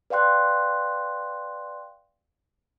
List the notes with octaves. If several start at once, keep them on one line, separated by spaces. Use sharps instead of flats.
B4 D5 F5 G5 C6 F#6